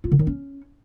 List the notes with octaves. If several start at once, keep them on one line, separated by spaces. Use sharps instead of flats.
F4
D3
D#3
C#4